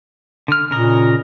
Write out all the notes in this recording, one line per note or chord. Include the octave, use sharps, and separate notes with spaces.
D3 F6
A#2 C#3 A#4 D#5